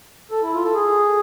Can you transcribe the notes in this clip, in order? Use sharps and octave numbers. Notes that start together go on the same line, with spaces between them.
A4
E4
F4
A4
G#4